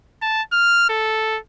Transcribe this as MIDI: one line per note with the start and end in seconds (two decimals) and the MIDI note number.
0.22 0.42 81
0.53 0.89 89
0.89 1.38 69